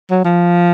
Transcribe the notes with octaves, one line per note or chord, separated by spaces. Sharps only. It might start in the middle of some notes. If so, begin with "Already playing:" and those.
F#3
F3